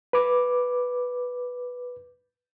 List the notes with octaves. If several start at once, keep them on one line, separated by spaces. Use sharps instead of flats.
B4 D6